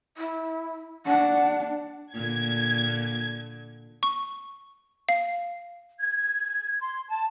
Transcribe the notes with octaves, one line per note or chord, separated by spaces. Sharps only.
E4
D4 F#5
A#2 D3 G#6
C#6
F5
G#6
C6
A5